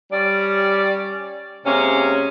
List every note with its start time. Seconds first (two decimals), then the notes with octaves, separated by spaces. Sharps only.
0.12 G3 C#4 D5
1.65 C3 G#3 A#3 C#4